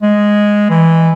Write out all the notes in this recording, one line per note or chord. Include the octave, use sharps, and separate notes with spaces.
G#3
E3